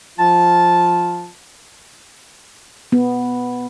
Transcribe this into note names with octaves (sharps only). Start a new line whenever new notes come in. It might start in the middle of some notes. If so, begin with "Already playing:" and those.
F3 F4 A5
B3